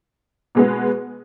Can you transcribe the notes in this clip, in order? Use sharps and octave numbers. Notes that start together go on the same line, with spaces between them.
B2 G#3 B3